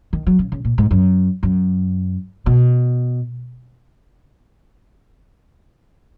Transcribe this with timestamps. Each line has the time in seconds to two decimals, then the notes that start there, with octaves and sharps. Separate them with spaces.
0.13 D#3
0.27 F#3
0.39 C#3
0.52 C#3
0.65 A#2
0.78 G#2
0.91 F#2
1.43 F#2
2.46 B2